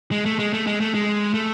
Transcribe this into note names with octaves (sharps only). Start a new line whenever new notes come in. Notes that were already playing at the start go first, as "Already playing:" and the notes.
G#3
A3
G#3
A3
G#3
A3
G#3
A3